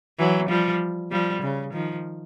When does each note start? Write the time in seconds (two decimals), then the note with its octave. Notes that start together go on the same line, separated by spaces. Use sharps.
0.19 E3 F#3
0.49 F3 G3
1.11 F3 G3
1.42 C#3
1.73 D#3 F3